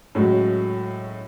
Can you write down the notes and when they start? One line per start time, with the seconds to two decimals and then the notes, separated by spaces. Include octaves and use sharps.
0.15 A2 C#3 F#3 G#3 F#4